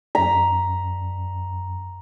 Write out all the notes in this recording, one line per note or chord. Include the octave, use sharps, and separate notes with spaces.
F#2 A#5 B6